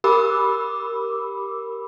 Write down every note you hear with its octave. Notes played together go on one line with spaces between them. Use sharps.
G4 A#4 B5 D6 E6